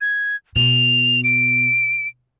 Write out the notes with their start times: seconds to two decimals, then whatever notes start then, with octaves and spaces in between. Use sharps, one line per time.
0.01 G#6
0.56 B2 F7
1.24 D7